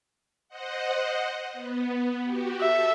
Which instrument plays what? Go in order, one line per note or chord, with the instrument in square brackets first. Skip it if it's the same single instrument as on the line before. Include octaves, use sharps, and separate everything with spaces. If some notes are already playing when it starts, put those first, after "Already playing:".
[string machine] C5 D#5 F#5
B3
F#4 G4
[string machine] A4 E6 [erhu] E5